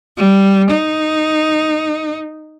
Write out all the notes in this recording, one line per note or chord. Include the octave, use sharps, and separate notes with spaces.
G3
D#4